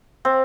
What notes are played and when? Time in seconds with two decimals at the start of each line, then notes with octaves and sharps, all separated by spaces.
0.25 C4